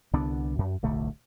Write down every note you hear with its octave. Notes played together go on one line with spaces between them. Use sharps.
C2 D3 B3 D4
F#2
D1 B1 D3 A3